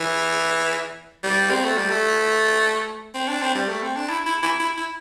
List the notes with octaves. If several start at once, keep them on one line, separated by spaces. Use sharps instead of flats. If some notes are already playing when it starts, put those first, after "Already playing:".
Already playing: E3
G3
C4
A3
G3
A3
C4
D4
C4
G3
A3
C4
D4
E4
E4
E4
E4
E4